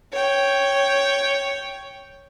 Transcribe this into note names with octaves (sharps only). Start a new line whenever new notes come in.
C#5 G5